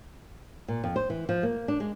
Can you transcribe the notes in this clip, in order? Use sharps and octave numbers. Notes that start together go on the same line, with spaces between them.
A#2
F2
C5
E3
F3
A#3
D4
G#3